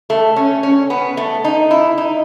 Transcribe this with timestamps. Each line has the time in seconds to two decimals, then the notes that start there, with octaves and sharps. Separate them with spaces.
0.10 A3
0.36 C#4
0.63 C#4
0.90 B3
1.17 A3
1.44 D#4
1.71 E4
1.98 D#4